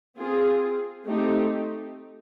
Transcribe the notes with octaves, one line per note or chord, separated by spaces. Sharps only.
C4 F4 G#4
A3 C4 D#4 G4